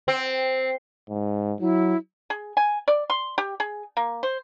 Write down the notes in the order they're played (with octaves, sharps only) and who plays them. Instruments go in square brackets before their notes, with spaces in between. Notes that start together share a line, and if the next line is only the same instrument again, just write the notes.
[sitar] C4
[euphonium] G#2
[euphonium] F#3 [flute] E4
[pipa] G#4
G#5
D5
C6
G4
G#4
A#3
C5